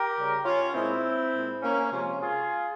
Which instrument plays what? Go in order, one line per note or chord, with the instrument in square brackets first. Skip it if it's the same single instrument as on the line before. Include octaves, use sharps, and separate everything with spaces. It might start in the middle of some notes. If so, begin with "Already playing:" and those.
Already playing: [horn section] G4 A#4
C#3 G3
C#4 F4
A#2 G#3 C4 E4
A#2 G#3
A#3 C#4
C3 F3 G#3 C#4 F4
F4 G#4